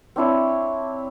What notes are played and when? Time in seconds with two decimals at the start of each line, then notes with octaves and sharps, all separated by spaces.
0.16 C4 D4 E4 C#5